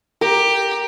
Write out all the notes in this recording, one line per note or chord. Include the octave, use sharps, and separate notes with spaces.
G4 A#4